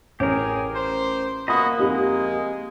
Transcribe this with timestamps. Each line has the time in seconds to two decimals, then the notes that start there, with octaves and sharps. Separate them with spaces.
0.20 A1 G4 G#4 A#4 C#5
0.75 C5
1.48 A#3 F#4 D#5 B5 D#6
1.79 F2 G#3 D#4 G4